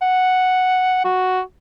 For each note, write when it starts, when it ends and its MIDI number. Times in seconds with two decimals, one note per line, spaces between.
0.02 1.00 78
1.05 1.41 66